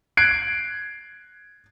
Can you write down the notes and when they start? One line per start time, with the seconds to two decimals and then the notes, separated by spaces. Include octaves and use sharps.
0.17 F#6 G#6 C7 D7